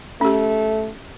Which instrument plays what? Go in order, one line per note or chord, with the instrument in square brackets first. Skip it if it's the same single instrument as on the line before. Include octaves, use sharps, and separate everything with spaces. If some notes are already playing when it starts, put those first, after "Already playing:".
[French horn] A3 [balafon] C#4 G4